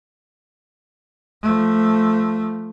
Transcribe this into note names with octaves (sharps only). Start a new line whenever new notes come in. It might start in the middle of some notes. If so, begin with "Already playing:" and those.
F3 A3